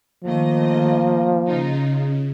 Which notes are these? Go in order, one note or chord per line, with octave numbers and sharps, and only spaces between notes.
D#3 F3 A3 A#3 D#5
C#3 D#4 F4